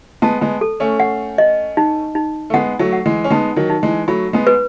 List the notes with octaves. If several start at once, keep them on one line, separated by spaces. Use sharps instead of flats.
G#3 B3 A5
G#3 B3
A4
A3 C#4
F#5
D#5
D#4
D#4
A3
G#3 B3 F#5
F#3 A3
F#5
E3 G#3
C#4
G#3 B3 D#4
D#3 F#3
D#4
E3 G#3
F#3 A3 B5
G#3 B3
B4